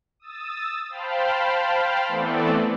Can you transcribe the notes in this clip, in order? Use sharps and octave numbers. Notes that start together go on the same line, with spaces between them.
D#6 E6 A6
C5 F5 G5 A5 B5 F6
E3 A3 B3 C4 A4 D5